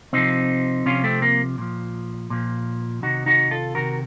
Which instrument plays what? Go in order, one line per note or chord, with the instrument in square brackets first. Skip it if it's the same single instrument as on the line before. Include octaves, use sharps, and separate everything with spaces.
[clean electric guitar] C3 F3 C4 D#4
C3 F3 C#4 F4
A3 C4
A#3
A#2 F3
A#2 F3
C3 D#3 D#4 F#4
D#4 F#4
F4 A4
C3 D#3 F#4 A#4